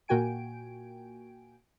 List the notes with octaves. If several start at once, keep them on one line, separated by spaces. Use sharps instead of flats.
A#2 A#3 F#4 G5 G#5 D7